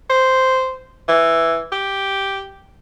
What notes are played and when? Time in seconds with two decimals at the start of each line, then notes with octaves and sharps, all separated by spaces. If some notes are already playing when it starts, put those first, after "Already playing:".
0.10 C5
1.08 E3
1.72 G4